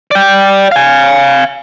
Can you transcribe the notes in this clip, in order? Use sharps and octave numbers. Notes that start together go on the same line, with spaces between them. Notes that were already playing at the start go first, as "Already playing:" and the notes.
D5 G5
F5 G#5